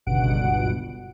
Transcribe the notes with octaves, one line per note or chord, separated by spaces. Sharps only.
G1 C#2 G2 B2 F#5 D7